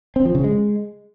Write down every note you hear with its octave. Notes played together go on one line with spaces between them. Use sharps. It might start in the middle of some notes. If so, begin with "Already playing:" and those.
C4
F3
C#3
G#3